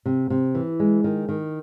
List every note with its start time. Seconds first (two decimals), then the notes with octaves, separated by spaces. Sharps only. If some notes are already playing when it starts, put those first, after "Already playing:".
0.06 C3
0.30 C3
0.55 E3
0.80 G#3
1.04 D#3
1.29 D#3